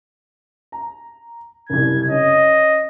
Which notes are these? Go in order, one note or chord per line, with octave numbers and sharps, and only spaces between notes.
A#5
F#1 C2 G#6
C#4 D#5